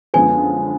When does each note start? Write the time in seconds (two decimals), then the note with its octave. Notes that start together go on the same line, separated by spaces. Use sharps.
0.14 F#2 D3 F3 G#3 B3 G#5